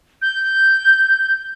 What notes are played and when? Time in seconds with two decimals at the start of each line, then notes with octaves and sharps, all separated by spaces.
0.22 G6